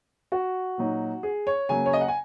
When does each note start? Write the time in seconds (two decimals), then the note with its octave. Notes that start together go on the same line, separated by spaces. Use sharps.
0.32 F#4
0.78 A#2 F#3 D#4
1.23 G#4
1.47 C#5
1.69 C#3 F#3 A#3 G#5
1.86 C#5
1.93 D#5
2.01 F#5
2.08 G#5